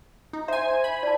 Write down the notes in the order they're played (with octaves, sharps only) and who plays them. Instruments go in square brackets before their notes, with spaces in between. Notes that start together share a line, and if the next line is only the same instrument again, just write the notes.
[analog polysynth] D#4
[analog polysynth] C5 G#5 [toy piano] E5
[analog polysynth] B5
[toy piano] D5 A5